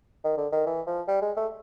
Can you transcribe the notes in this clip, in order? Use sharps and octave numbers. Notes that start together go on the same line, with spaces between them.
D#3
D3
D#3
E3
F3
G3
G#3
A3